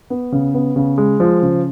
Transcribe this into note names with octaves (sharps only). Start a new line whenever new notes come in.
B3
C#3
B3
C#3
G#3
F3
C#3